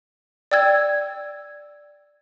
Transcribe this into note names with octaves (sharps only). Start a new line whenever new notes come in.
D5 G5 E6 G#6